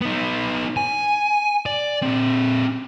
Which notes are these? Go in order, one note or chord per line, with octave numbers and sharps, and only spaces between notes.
B3 D#4
G#5
D5
A#2 C4